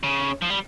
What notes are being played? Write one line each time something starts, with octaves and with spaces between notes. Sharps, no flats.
C#3
F3
G3